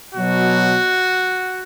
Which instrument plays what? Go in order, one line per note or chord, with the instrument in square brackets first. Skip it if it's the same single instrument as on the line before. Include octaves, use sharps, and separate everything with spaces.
[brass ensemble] B2 F#3 F#4